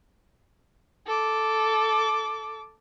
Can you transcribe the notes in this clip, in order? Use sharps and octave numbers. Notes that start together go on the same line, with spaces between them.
A4 D6